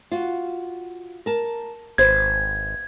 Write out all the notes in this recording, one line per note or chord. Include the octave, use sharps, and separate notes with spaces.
F4 F#4
A#4 A5
G#1 B4 C5 G#6